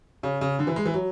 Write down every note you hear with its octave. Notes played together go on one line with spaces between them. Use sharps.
C#3
C#3
D3
E3
G#3
E3
F#3